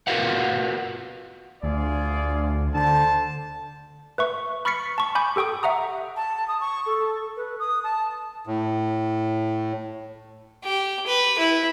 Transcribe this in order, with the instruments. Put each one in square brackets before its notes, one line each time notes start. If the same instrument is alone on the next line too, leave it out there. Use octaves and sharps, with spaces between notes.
[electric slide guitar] F4 F#4 A#4 B4 F5 F#5
[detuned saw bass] D2 [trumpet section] F4 G#4 D5
[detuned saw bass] D3 [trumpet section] C5 A5
[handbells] B4 E5 C#6
B5 C#6 F6 A6 B6 C#7
A5 C#6
G#5 B5 D6 G6
G4 A4 G5 C#6 D#6
E5 F#5 A#5 D#6
[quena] A5
D#6
C#6
A4
B4
D#6
A5
[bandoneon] A2
[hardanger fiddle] G4
B4
E4